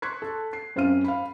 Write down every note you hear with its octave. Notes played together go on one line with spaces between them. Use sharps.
C6 C#6 F#6 G#6 B6
A4
C7
F#2 C4 C#4 F5 F6 D#7
F5 B5